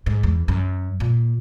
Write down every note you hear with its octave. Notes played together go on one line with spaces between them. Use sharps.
G#2
E2
F#2
A#2